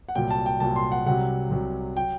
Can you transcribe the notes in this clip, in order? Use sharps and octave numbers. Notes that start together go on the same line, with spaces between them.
F#5
C2 A#2 F#3 G5
A5
G5
C2 A#2 F#3 A5
C6
F#5
C2 C3 F#3 F#5
C2 C3 F#3
F#3 G5